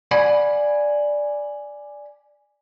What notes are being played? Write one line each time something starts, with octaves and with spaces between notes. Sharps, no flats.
D5 F#5 G#5 B5